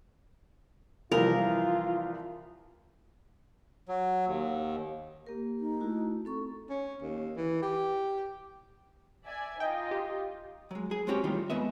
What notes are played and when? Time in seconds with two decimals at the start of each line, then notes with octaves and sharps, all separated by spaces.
1.12 C2 E3 F3 F4 A#4
3.88 F#3
4.27 D#2
5.26 A#3 G4 A#4
5.60 D#4
5.80 A3 E4 F#4
6.25 C4 A4 C#6
6.70 C#4
7.03 D#2
7.37 E3
7.63 G4
9.25 D5 E5 G#5
9.60 D#4 F4 D#5 G5
9.91 G4
10.71 F#3 G#3
10.91 G#4 G#5
11.07 G#3 C4 C#4 F#4 G4 C#5
11.24 D#3 E3 G3 A3 D#4 F4
11.50 F2 G#3 B3 D#5 E5